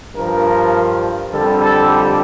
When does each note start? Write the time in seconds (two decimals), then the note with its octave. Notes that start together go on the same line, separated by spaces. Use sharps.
0.15 G2 F3 A#4
1.32 F2 D3 G3 A4
1.62 A4
1.90 G4